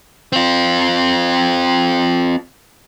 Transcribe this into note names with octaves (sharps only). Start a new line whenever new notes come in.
C4 F4